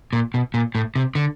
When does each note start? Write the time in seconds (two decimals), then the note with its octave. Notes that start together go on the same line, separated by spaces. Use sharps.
0.13 A#2
0.34 B2
0.54 A#2
0.75 A2
0.96 C3
1.15 D3